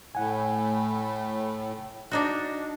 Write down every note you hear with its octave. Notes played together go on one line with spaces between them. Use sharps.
A2 F#5 G#5
D4 D#4 F#4